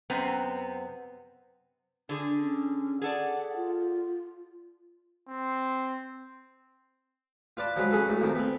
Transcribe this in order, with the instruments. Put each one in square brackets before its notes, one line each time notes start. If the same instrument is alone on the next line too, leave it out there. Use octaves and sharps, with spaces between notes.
[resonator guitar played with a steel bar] F#2 C3 B3 C4
[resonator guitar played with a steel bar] D3 G#4 [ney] D4
[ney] C#4
[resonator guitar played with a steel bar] G#4 A4 D5 [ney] F#5
[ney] F4
[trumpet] C4
[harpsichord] F4 B4 D5 A5
F3 F#3 G#3 B4
C#4 G#4 A4 B4
A2 F#3
F2 D#3 F3
B3 C4